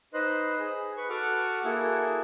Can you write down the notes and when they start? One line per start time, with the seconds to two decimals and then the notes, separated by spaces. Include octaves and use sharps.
0.14 D#4 B4 C5 D#5 C6 F#6
0.59 G#4
0.97 B4 B5 C#6
1.10 F#4 A4 F#5 C#6 D6 F6
1.64 A#3 E4 F#4 G#4 A4